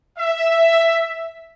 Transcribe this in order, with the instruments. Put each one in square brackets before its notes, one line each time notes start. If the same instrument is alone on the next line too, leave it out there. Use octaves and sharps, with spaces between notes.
[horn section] E5